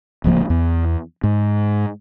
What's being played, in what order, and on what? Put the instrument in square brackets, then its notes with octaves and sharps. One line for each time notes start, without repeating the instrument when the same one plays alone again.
[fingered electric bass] D1 C#2 F3 A#3
E2
G#2